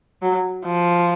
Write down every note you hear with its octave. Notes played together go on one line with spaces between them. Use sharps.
F#3
F3